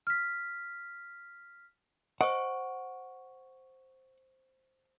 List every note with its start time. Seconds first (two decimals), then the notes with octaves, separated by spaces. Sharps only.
0.07 F6 B6
2.21 C5 D#5 F#5 C#6 D7